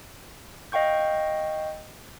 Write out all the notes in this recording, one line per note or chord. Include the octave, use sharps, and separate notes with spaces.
D#5 F5 G5 C#6 G6